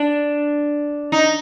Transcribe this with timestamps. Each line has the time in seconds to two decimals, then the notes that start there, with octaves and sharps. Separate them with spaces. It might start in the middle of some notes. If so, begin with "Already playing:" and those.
Already playing: D4
1.12 D#4